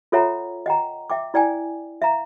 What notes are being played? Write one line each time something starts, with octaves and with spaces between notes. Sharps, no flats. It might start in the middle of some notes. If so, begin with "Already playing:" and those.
F4 A4 C#5 E5 F#5 A#5
D#5 F#5 G5 A#5
E5 G5 D6
E4 D5 G5 G#5
E5 F5 A#5